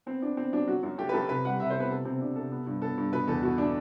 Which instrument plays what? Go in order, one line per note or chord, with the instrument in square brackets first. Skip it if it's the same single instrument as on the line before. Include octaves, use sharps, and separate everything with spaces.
[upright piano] B3 C4
B3 D4
B3 C4
F#3 D4
F#3 F#4
F#2
A3 G4
B4
F#2 A4
C3 B4
G3 F#5
C3 E5
C5
B3
B4
C3 A4
C3 C4
C3 D4
C3 A4
B3
G2
B3 A4
G2
B2 B4
E2 A4
B2 F#4
A3 D4